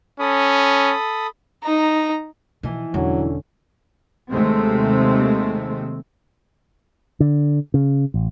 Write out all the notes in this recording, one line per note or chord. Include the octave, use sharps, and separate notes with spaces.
C#4 A4 B5 D#6
D#4 A#5
B2 E3 F3 D#4
E1 D3 F#3 C#4
D#2 C3 G#3 A3 C4
D3
C#3
A1